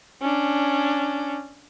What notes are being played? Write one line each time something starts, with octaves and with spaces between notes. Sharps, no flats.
C#4 D4